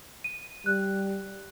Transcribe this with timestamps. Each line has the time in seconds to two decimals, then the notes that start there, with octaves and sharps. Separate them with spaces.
0.24 D#7
0.66 G3 F#6